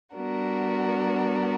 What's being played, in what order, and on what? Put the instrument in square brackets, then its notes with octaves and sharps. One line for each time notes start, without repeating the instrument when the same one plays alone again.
[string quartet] G3 B3 D4 F#4 A#4